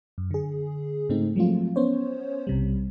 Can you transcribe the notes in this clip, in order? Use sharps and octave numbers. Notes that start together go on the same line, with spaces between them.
F#2
D3 G#4
G#2 C#3 A3 C4 D#4
F3 F#3 G#3 A3 C4 F4
B3 C#4 C5 C#5
B1 C3 G3